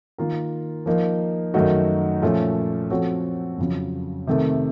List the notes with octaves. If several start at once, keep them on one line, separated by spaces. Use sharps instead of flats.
D#3 A#3 F4 A#4
F3 A#3 D#4
F#2 D#3 A3 D#4 F#4
A#2 F3 A3 C#4
F3 C4 F#4 A4 C#5
F2 C#3 F#3
C3 D#3 A3